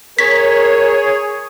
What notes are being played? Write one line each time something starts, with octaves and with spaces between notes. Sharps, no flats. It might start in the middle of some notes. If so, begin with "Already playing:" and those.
G#4 A#4 C#5 B6